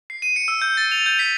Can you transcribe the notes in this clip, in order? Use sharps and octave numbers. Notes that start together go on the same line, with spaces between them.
C7
D#7
C#7
E6
G6
A6
F7
G6
B6